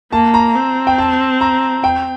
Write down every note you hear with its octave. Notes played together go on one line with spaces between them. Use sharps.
A#3 A5
A#5
C4
G5
A5
A#5
G5